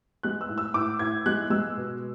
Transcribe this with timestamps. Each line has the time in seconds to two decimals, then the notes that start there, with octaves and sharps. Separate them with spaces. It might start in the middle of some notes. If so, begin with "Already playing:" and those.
0.23 G#3 F#6
0.41 E6
0.49 A2
0.58 E6
0.74 A2 D6
0.99 A2 G#6
1.26 G#3 F#6
1.50 G#3 E6
1.77 B2